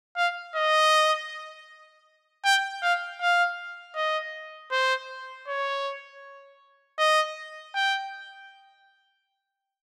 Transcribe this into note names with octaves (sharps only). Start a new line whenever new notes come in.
F5
D#5
G5
F5
F5
D#5
C5
C#5
D#5
G5